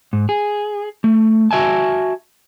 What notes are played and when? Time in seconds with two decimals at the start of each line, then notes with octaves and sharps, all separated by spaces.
0.13 G#2
0.29 G#4
1.04 A3
1.51 F#4 E5 G#5 A5